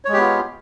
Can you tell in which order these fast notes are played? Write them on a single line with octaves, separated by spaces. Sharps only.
C#5 G#3 G4 B3 F4